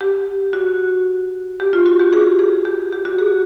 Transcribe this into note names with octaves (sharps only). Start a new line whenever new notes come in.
G4
F#4
G4
F4
F#4
G4
G#4
G#4
G4
G4
F#4
G#4